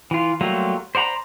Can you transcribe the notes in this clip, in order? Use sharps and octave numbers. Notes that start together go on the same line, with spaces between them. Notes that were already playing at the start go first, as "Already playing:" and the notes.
E3 F4
F#3 G3 A3 A#3 F4
C5 D5 F#5 A#5 B5